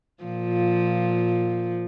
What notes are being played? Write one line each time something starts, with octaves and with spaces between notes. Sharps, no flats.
A#2 F3